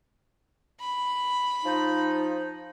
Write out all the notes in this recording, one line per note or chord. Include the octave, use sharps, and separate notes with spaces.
B5
F3 D#4